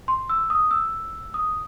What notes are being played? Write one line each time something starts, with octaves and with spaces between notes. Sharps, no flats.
C6
E6
D#6
E6
D#6